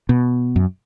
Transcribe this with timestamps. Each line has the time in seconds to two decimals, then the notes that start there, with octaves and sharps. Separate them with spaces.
0.09 B2
0.56 F#2